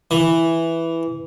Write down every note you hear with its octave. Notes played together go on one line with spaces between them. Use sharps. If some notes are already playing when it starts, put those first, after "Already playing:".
E3